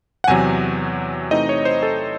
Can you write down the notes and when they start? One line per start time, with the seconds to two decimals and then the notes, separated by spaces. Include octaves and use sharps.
0.24 F#5
0.28 E2 C3 F#3 G#5
1.31 C3 E3 A3 C4 D#4 D#5
1.49 C#5
1.65 C5
1.83 A4